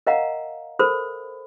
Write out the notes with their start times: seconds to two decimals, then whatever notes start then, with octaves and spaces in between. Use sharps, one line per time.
0.07 A#4 D#5 F5 F#5 A#5
0.79 A4 A#4 C5 B5